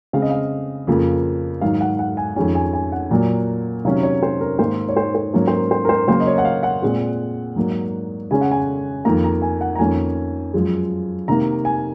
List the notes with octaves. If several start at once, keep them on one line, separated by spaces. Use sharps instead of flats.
C#3 G#3 C4 F5
D#5
F5
F2 C#3 F3 A#3
G#2 D#3 F#3 F5
F#5
F#5
G#5
F2 D#3 G#3 C#4 G#5
G#5
G#5
F#5
A#2 F#3 A#3
C3 D#3 F#3 C#4 F5
C#5
C5
A#4
G#2 D#3 A#3 C5
C#5
C5
C5
G#2 F#3 A#3 C#4 C#5
C5
A#4
C5
A#4
C5
C#3 F#3 A#3 C5
D#5
C#5
F#5
F5
F#5
A#2 G#3 C4
G#2 F#3 A#3
C#3 G#3 C#4 G#5
F#5
G#5
F2 D#3 A#3 A#5
A#5
G#5
F#5
A#5
F2 D#3 A#3 C#4 G#5
F#2 F3 G#3
C3 D#3 A#3 A#5
G#5